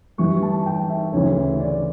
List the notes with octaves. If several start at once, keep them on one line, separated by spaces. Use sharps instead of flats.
G2 E3 G3 C#6
A5
G5
E5
D2 C#3 E3 C#5
D5